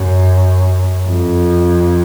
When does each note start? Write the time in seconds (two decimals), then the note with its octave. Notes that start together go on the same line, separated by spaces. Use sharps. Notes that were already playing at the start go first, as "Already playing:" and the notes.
Already playing: F#2
1.08 F2